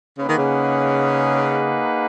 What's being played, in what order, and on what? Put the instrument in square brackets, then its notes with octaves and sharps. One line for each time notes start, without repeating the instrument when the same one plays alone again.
[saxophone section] C#3 [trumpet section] A#3 D#4 G#4 B4 F#5
[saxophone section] D#3
C#3